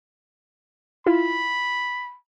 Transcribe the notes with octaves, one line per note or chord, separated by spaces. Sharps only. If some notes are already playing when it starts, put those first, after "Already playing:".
E4 F4 B5